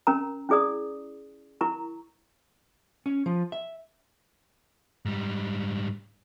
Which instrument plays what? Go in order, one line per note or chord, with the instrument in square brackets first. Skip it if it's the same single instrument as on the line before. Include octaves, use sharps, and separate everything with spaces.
[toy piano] C#4 A#4 A#5
C#4 E4 G#4 D5 D#6
E4 A#4 A#5 C#6
[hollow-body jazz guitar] C#4
F3
E5
[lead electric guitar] G#2 G3